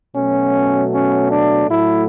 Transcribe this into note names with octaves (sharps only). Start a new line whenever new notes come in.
B2 F#3 A3 C#4
C#4
D4
A2 F#3 A3 E4